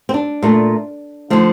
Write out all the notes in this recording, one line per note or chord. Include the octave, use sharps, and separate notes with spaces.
C4
D4
A#2 A3
D3 F3 A3